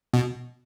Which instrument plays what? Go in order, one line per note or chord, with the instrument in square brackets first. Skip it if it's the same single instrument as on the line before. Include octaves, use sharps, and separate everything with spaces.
[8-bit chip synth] B2